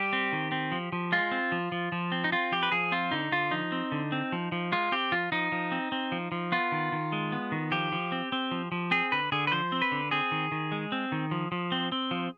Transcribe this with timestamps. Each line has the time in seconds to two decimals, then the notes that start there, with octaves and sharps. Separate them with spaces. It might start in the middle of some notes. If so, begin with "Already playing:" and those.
Already playing: G3 G4
0.13 C4
0.32 D#3
0.52 C4
0.72 F3
0.92 F3
1.12 G#3 F4
1.32 C4
1.52 F3
1.72 F3
1.92 F3
2.12 C4
2.24 D#4
2.32 C4 F4
2.52 F3 G4
2.63 B4
2.72 F3 G#4
2.92 C4 F4
3.11 D3 D#4
3.32 D3 F4
3.51 F3 D#4
3.72 C4
3.92 D3
4.12 C4
4.32 F3
4.52 F3
4.72 G#3 F4
4.92 C4 G4
5.12 F3 F4
5.32 F3 D#4
5.52 F3
5.72 C4
5.92 C4
6.12 F3
6.32 F3
6.52 B3 F4
6.72 D#3
6.92 D#3
7.12 G#3
7.32 B3
7.52 D#3
7.72 F3 G4
7.92 F3
8.12 C4
8.32 C4
8.51 F3
8.72 F3
8.91 C4 G#4
9.12 D3 B4
9.32 D3 G#4
9.47 B4
9.52 F3 C5
9.72 C4
9.82 B4
9.92 D3
10.11 C4 G#4
10.32 D#3
10.52 D#3
10.72 G#3
10.92 C4
11.12 D#3
11.31 F3
11.52 F3
11.72 C4
11.92 C4
12.11 F3